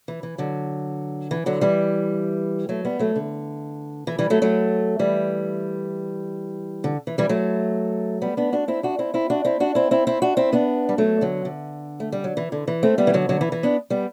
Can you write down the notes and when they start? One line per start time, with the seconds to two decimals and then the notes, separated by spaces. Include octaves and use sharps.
0.08 E3
0.23 E3
0.38 D3 F#3
1.31 E3
1.46 D3 F#3
1.61 E3 G3
2.69 F#3 A3
2.85 G3 B3
2.99 F#3 A3
3.16 D3
4.07 E3
4.19 E3 G3
4.30 F#3 A3
4.42 F#3 A3
4.99 E3 G3
6.84 D3
7.07 E3
7.18 E3 G3
7.29 F#3 A3
8.22 G3 B3
8.37 B3 D4
8.52 D4 F#4
8.68 C4 E4
8.83 D4 F#4
8.99 C4 E4
9.14 C4 E4
9.30 D4 F#4
9.45 C4 E4
9.60 D4 F#4
9.75 C4 E4
9.91 C4 E4
10.07 C4 E4
10.22 D4 F#4
10.37 C4 E4
10.53 B3 D4
10.89 G3
10.98 F#3 A3
11.21 D3 F#3
11.45 D3
12.00 A3
12.12 G3
12.24 F#3
12.37 E3
12.52 D3
12.68 E3
12.83 A3 C4
12.98 G3 B3
13.07 E3
13.14 D3 F#3
13.29 D3 F#3
13.41 E3
13.52 E3
13.63 B3 D4
13.90 G3 B3